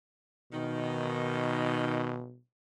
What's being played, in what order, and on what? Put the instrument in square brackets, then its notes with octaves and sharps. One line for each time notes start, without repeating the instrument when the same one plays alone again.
[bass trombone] B2 [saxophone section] D#3